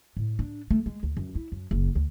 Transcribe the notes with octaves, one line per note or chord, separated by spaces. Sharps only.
A2
D4
A3
G#3
D2
F#2
E4
F#2
F#1
D2